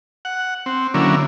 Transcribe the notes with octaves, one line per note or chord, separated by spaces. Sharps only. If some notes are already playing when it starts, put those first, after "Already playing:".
F#5
C4
D3 F#3 A#3 C#4 E4